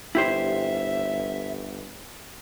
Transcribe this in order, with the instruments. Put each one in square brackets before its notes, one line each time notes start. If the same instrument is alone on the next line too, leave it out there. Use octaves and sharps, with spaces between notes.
[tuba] G1 [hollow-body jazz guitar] E4 G4 C5 [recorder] E5